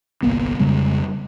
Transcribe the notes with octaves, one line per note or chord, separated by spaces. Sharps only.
G1 C2 A#3 B3
F2 C#3 G3 G#3